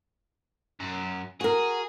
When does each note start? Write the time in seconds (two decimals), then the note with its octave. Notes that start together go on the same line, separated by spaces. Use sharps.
0.80 F#2
1.41 F#4 G#4 A#4